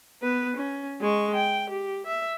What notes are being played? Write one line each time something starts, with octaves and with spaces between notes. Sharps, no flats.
B3 B4
C#4
G#3 C#6
G5
G4
E5